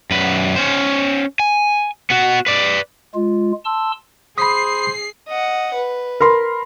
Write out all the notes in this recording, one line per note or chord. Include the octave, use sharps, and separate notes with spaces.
F#2 B4
C#4 C5
G#5
B3 F#4
B4 D5
G#3 F4
A5 C6 E6
G#4 C5 B5 D#6 C7
D#5 F#5
B4
A#4 B5 C6